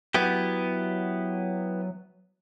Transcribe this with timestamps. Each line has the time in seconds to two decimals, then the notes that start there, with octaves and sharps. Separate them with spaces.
0.14 F#3 B3 E4 G4